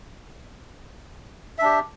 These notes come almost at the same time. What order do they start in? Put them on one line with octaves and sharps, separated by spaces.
E5 D4 G4